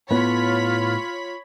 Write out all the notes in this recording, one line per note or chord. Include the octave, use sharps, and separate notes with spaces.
A2 B3 F4 C#5 B5 B6